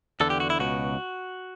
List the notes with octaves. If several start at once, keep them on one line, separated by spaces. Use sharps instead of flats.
E2 D3 A4
G4
F#4
E4
C#2 B2 F#4